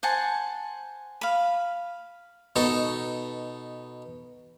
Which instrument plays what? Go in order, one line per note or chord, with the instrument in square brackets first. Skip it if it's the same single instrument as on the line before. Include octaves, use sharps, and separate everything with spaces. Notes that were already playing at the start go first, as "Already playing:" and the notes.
[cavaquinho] C5 F#5 G#5 A5
F5 B5
[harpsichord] B2 D#4 A4